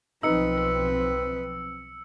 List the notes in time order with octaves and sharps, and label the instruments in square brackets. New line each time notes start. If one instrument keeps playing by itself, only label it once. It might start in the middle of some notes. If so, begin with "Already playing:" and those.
[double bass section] B1 F3 C4 [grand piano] D#4 [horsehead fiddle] B4 [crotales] E6 C#7